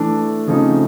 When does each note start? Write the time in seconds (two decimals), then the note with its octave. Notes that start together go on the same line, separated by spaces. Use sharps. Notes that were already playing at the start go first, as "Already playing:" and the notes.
Already playing: E3 A3 D4
0.47 C#3 F3 A3 C4 D#4